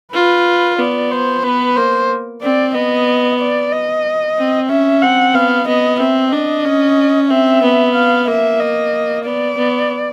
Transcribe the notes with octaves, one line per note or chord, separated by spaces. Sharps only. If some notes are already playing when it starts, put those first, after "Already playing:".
F4 B4
B3 D5
C5
B3 B4
A#3 C5
C4 D5
B3 D#5
D5
D#5
C4
C#4 E5
C4 F#5
B3 F5
B3 D#5
C4 E5
D4 D#5
C#4
C4 E5
B3
F5
A#3 E5
D#5
B3 D5
B3